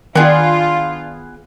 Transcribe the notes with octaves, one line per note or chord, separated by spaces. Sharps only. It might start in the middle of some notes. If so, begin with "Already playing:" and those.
D#3 B3 D4 F4 G#4 D5 G5